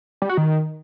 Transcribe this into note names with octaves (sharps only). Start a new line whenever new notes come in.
G3
F#4
D#3